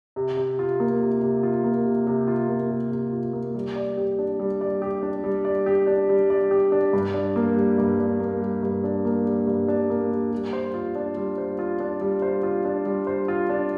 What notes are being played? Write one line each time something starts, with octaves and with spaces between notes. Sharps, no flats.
C3
C3
F4
A#3
C3
C3
F4
A#3
C3
C3
F4
A#3
C3
C3
F4
A#3
G3
D5
G4
D4
G3
D5
G4
D4
G3
D5
G4
D4
G3
D5
G4
D4
G2
D4
A#3
G3
G2
D4
A#3
G3
G2
D4
A#3
G3
G2
D4
A#3
G3
G3
C5
F4
D4
G3
C5
F4
D4
G3
C5
F4
D4
G3
C5
F4
D4